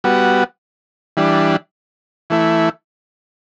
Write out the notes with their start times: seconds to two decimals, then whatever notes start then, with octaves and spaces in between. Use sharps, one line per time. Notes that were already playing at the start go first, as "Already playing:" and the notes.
0.04 G3 B3 F#4
1.17 E3 G3 D4
2.30 E3 A3 E4